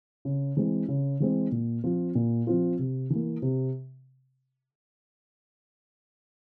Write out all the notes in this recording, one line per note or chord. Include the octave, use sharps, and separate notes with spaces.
C#3
E3 G#3 C4
C#3
E3 G#3 C4
A#2
F3 C4 F4
A#2
F3 C4 F4
C3
E3 A#3
C3